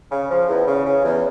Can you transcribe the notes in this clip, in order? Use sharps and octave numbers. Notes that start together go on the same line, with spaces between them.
C#3
F3
E2
C#3
C#3
E2